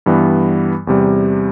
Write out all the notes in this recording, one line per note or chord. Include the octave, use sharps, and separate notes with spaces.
G2 E3 G3 B3
E2 C3 G3